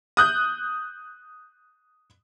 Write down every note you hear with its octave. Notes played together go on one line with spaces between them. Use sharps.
D#6 F#6 G6